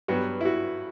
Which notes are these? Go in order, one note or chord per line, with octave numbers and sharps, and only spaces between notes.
G2 F#3 B3 F#4
E4
F#4